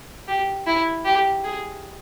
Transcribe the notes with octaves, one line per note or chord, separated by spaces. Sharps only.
G4
E4
G4
G#4